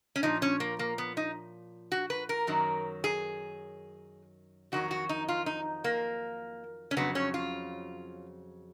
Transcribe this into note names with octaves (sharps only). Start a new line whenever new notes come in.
C#4
A#2 F3 D#4
C#4
A#3
A#3
B3
D#4
F#4
B4
A#4
F#2 D#3 F#3
G#4
F2 D#3 F#3 F#4
F#4
D#4
F4
D#4
A#3
C#4
F2 C#3 F#3 B3
C#4
F4